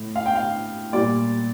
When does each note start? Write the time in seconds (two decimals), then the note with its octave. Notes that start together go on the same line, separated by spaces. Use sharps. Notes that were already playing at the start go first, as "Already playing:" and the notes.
Already playing: A2 A3
0.16 F5
0.26 G5
0.35 F5
0.93 A#2 G3 A#3 D5